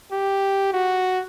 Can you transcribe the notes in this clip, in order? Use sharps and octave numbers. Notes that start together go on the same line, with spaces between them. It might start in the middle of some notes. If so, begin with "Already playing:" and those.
G4
F#4